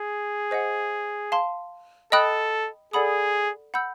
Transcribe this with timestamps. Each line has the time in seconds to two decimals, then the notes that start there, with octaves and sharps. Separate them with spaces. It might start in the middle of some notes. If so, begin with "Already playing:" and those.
Already playing: G#4
0.51 C5 D#5 F#5
1.32 F5 A5 C6
2.12 A4 D#5 G5 B5 D#6 F#6
2.93 G#4 A4 D5 F#5 B5 D#6
3.74 F#5 B5 E6 G6